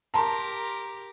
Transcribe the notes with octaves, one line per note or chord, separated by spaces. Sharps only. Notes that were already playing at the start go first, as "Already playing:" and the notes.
G4 A#4 A5 A#5 C6